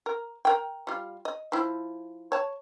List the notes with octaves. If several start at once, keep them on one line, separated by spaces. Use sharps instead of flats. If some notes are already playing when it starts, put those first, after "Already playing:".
A#4
A#4 G5
G3 F4
D#5
F3 E4
C#5 A5